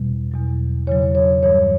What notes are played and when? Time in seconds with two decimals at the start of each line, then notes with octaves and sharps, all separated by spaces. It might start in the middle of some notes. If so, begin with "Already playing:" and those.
Already playing: E2 B2 G3
0.32 E2 B2 F#3
0.87 E2 C#3 F#3 C#5
1.15 C#5
1.42 G2 E3 G3 C#5